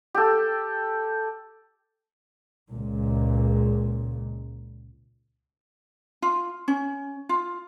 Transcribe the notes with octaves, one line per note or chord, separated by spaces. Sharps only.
G4 A4
C#2 A#2
F4
C#4
F4